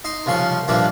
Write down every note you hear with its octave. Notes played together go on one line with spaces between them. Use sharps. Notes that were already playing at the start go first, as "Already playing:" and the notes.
D#4 C6
C2 C#3 F3 C6 C#6
G2 A#2 F3 A#3 D4 E4